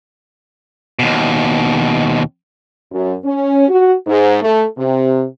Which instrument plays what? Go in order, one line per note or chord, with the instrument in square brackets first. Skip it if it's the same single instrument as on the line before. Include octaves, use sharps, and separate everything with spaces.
[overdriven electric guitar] D#2 B2
[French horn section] F#2
C#4
F#4
G#2
A3
C3